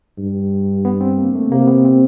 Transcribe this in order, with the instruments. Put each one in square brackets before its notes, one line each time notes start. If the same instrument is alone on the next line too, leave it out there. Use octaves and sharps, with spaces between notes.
[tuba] G2
[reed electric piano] B3
C4
A#3
A3
[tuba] C3 [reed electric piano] A#3
[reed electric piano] B3
C4